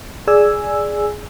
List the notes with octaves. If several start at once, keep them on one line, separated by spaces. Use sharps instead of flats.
G#4 D5 G#5 E6